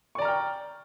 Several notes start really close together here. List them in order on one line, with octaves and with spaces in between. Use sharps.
C#6 D5 A#5 F6 G5